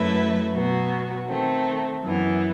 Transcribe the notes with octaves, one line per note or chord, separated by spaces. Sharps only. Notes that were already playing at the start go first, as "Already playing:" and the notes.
Already playing: F#2 F#3 A3 E4 B4
B2 F#3 B3 F#4
D#3 A3 C4
F#2 E3 B3